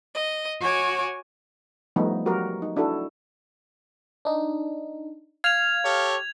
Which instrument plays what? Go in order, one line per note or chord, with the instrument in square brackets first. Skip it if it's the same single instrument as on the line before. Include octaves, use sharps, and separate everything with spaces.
[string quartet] D#5
F#4 C#5 G#5 D6
[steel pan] F3 G3 A3 B3 D#4
F#3 F#4 G4 A#4
D#4
D4 E4 F#4 A4
[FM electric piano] D4 D#4
[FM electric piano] F5 F6 [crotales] G#6 F7
[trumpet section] G4 A4 C#5